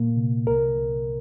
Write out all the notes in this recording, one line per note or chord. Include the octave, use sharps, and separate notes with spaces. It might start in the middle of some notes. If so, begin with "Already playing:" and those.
Already playing: A#2 A#3
C3
C2 A#4
C2